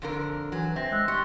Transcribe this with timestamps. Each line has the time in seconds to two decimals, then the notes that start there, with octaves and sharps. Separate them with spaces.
0.02 F2 D3 A#4
0.52 E3 F#3
0.76 C4 E5 A#6
0.92 G#3 E6 F#6 A#6
1.08 G3 C6 C#6 C#7